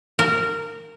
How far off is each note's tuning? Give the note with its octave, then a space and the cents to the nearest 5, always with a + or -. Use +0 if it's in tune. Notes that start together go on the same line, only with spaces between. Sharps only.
A#4 -20